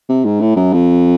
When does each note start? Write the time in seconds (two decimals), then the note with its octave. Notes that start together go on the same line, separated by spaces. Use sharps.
0.09 C3
0.25 G#2
0.41 A2
0.56 F#2
0.73 F2